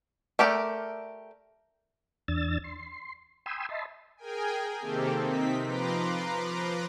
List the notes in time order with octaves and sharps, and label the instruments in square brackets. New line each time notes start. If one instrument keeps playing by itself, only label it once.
[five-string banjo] A3 G4 A#4 D5
[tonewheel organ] E2 D4 E6 A6
C6
G5 G#5 B5 C6 D#6 E6
D#5 E5 A5 B5 C6
[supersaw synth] G#4 A#4 G5 G#5
C3 D#3 A#3 C4 G4 A4
C3 C4 D#4 B6
F3 B4 A#5 C6 D6